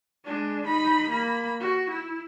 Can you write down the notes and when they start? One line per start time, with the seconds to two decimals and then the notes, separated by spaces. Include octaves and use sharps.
0.25 G#3 D4
0.65 D#4 B5
1.10 A#3 B5
1.60 F#4
1.90 E4